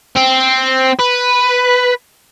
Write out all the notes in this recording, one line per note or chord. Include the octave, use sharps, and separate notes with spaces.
C4
B4